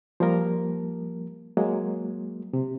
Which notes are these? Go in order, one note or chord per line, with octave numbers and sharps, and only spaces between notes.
F3 G3 A#3 A#4
F#3 G#3 A#3
C3